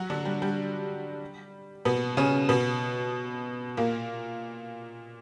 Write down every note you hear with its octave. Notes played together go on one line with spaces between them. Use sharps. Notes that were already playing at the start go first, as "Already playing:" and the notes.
Already playing: F#3 F#4
D3 D4
G3
G3
B2 B3
C#3 C#4
B2 B3
A#2 A#3